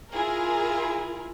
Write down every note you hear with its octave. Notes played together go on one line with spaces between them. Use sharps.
E4 F4 G#4 A#4